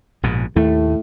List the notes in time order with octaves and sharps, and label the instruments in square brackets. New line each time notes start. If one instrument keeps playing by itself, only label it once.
[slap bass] A#1 G#2 B2
[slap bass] D#2 A3 [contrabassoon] A2